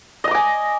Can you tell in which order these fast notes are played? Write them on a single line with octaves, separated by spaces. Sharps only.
D#5 A#5 D6 G#5